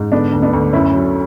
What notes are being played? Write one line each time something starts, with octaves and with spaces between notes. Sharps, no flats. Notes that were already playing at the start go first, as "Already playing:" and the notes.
Already playing: G#2
D3 B3 D4
D2
B3 D4
D2
F#2 C#4 E4
F#3